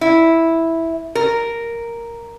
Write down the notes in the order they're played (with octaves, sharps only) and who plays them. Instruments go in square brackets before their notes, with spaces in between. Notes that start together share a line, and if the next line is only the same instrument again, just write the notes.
[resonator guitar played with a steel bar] E4
A#4